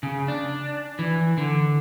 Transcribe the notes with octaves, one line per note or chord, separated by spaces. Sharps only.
C#3
D4
E3
D3